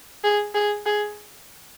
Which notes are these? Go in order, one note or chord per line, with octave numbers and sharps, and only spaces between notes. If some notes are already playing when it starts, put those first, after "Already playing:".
G#4
G#4
G#4